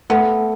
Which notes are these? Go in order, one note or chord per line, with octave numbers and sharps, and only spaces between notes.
A3 B3